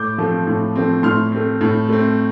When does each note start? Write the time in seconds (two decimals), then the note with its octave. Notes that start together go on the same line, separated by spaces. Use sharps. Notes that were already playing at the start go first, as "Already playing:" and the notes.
Already playing: A2 D6 G6
0.18 F3 A3 C4
0.47 A2
0.75 F3 A3 C4
1.03 A2 C6 F6
1.32 A3 C4
1.61 A2
1.89 A3 C4